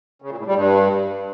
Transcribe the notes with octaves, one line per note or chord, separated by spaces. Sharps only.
C#3
A#2
A2
G3
G2